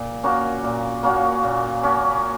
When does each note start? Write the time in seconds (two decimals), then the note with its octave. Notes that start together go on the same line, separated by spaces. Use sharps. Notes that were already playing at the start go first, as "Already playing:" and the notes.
Already playing: A#2
0.24 A#3 C#4 F#4
0.64 A#2
1.03 A#3 C#4 F#4
1.44 A#2
1.83 A#3 C#4 F#4